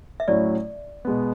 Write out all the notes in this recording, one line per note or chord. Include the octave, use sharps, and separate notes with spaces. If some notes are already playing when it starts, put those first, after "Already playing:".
E5
A2 F#3 C#4 E4 D5
B2 G#3 B3